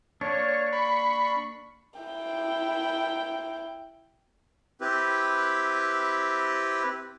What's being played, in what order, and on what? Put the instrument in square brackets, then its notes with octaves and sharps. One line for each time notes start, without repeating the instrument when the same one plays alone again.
[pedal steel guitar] A#3 D4 [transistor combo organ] C#5
[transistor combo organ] B5 C#6
[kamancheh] E4 G5
[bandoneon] C4 E4 G4 B4